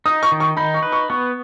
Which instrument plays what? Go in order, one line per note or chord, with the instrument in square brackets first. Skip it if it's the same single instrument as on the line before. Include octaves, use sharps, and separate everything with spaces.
[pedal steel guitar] D#4 [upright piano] D#6
[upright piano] C#6
[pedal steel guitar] D#3
[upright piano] C#6
[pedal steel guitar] D#4 [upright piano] B5
[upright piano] C#6
[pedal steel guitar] B4
[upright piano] C#6
[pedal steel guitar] B3 [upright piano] C#6